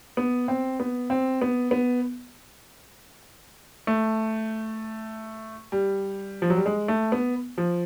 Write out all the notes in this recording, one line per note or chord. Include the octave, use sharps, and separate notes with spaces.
B3
C4
B3
C4
B3
B3
A3
G3
F3
F#3
G3
G#3
A3
B3
F3